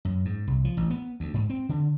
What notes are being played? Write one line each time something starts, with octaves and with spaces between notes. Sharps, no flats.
F#2
G#2
C2
F3
A1
B3
D2
G#2
C4
D3